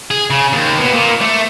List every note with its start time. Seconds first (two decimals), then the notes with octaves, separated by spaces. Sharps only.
0.11 G#4
0.30 C#3
0.53 D#2
0.79 B2
0.94 A#2
1.22 A3